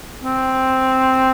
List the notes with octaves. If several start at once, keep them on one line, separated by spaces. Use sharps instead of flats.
C4